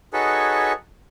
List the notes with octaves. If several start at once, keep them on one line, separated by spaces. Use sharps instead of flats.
D#4 F#4 G#4 A4 B4 C#5